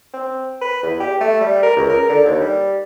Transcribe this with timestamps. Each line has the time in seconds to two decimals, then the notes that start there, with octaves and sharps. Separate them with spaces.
0.14 C4
0.61 B4
0.83 E2
1.00 G4
1.21 A3
1.41 G3
1.63 A#4
1.77 C#2
1.89 A#4
2.09 D3
2.25 D#2
2.41 G3